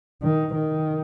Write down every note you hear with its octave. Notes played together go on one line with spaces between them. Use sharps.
D#3
D#3